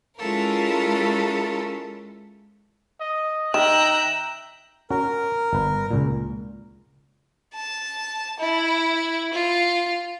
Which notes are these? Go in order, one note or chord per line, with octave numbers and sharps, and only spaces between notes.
G#3 C#4 E4 F4 A4 A#4
D#5
D#3 E5 G5 A#5 F#6 E7
C#4 F#4 A#4
G1 B4
C#2 A#2
A5
E4
F4